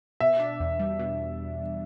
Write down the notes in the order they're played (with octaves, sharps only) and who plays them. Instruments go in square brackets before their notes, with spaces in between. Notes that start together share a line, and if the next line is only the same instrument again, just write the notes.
[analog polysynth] B2 [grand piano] E5
[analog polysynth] D4
E2
G3
B2